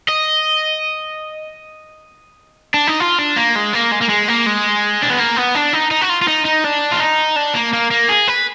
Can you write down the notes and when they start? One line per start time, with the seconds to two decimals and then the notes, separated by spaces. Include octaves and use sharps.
0.09 D#5
2.74 D4
2.87 D#4
3.00 F4
3.18 D4
3.36 A#3
3.55 G#3
3.73 A#3
3.91 G#3
4.01 A#3
4.09 G#3
4.28 A#3
4.46 G#3
5.03 D4
5.10 B3
5.18 A#3
5.37 B3
5.55 D4
5.73 D#4
5.91 D#4
6.01 F#4
6.09 F4
6.22 F4
6.28 D#4
6.45 D#4
6.64 D4
6.91 F4
7.00 D#4
7.36 D4
7.55 A#3
7.73 A#3
7.91 A#3
8.09 G#4
8.28 B4